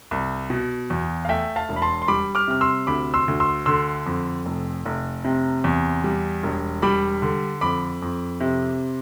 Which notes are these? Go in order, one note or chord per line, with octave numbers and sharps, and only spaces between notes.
C2
B2
E2
F5
A3 E5 G5
F5 A5
E1
B5
A5 C6
C6
G3 B5 D6
D6 F6
C3 F6
C6 E6
D2 B5 D6
C6 E6
D2
C6 E6
D3 C6 E6
F2
F1
F1
C3
E2
G3
E1
G3 B5 D6
D3
F2 B5 D6
F2
C3